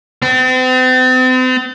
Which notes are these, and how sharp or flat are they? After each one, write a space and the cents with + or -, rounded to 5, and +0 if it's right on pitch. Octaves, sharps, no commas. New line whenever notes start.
C4 -40